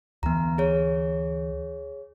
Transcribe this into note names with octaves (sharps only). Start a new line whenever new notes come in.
D2 E3 B3 A#5
G#4 C#5